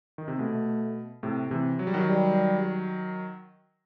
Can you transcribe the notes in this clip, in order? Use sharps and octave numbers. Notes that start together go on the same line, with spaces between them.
D#3
C3
B2 A3
A2 C3
C3 E3
F#3
G3
D#3 F#3
G3